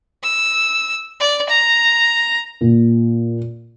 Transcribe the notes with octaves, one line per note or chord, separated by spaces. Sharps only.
E6
D5
A#5
A#2